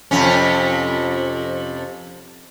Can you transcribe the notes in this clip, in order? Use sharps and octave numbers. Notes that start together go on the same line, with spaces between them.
F2 C3 C#4